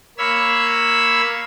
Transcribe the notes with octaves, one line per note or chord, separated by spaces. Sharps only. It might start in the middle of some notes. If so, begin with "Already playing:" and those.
A#3 C#5 B5 E6